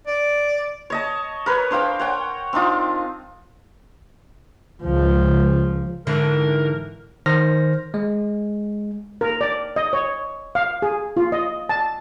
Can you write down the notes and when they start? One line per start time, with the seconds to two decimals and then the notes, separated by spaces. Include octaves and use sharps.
0.07 D5
0.90 C#5 D#5 A5
1.46 A#4 B4 C#5
1.71 D4 C5 F5 G5
1.99 C#5 F#5 G5
2.53 C4 D4 D#4 F4
4.83 C#2 F3
6.07 G#2 D3 E3 A#4
7.26 D#3 C5 F6 A#6
7.94 G#3
9.21 A#4
9.41 D5
9.76 D#5
9.93 C#5
10.55 F5
10.82 G#4
11.17 F4
11.32 D#5
11.69 A5